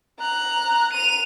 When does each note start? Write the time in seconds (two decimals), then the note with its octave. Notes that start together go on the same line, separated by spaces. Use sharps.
0.20 A#5 F#6
0.93 D#7 F7